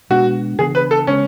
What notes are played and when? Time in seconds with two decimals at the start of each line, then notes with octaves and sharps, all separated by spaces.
0.10 B2 G#3 B3 D4 F#4
0.58 C#3 E3 B3 D4 G#4
0.75 B4
0.91 A4
1.07 C#3 G#3 B3 C#4